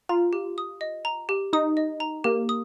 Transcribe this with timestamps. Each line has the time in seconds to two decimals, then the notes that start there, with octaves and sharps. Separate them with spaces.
0.09 F4 A#5
0.33 G4
0.58 D#6
0.81 D#5
1.05 A#5
1.29 G4
1.53 D#4 D#6
1.77 D#5
2.00 A#5
2.24 A#3 G4
2.49 D#6